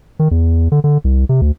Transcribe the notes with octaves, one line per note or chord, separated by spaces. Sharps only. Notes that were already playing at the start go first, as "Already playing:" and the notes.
D#3
E2
D3
D3
C2
C3
D2